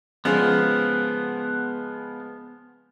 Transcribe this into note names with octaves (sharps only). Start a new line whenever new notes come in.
C#3 F3 G#3 B3